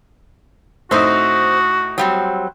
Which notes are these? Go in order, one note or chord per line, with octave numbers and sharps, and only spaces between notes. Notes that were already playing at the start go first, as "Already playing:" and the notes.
A2 C4 D#4 F#4 C5
F#3 G3 C4